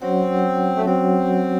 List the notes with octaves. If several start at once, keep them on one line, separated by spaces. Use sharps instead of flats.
F#3 C4 C#4 F#4 C#5 F#5
A3
F#3 C4 C#4 F#4 C#5 F#5